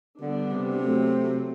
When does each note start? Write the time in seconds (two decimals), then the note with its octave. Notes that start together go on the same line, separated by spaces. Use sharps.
0.20 D3 G3 B3 D4
0.51 C3
0.81 F#3 A3 C4